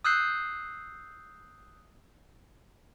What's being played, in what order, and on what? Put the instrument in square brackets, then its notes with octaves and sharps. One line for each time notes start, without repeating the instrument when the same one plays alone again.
[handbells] D#6 E6 F#6 G6 C7